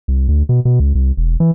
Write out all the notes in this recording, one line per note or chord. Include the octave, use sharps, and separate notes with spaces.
C2
D2
B2
B2
C#2
C2
E1
E3